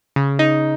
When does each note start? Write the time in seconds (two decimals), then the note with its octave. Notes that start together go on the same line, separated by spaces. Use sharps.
0.16 C#3
0.39 D#4